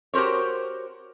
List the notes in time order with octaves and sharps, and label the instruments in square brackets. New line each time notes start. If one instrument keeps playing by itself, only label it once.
[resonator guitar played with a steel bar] F#4 G4 A#4 C5 C#5